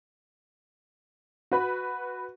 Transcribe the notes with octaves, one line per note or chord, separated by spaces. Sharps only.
F#4 B4 B5